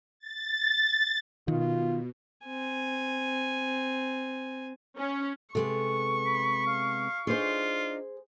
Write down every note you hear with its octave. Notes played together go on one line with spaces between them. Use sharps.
A6
B2 D#3 F4
C4 G#5
C#4
C3 G#3 B3 A4 C#6
B5
F5
D4 D#4 F4 G#4 C5